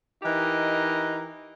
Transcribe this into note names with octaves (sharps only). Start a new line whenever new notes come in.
E3 D#4 G4 A#4 D#5